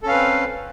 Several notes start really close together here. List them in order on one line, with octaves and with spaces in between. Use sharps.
A4 C#4 F5 B4 C4